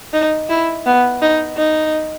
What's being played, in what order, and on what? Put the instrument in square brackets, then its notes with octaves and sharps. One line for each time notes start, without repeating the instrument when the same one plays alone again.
[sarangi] D#4
E4
B3
D#4
D#4